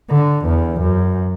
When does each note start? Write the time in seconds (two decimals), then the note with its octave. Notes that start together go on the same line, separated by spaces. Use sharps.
0.10 D3
0.46 E2
0.81 F#2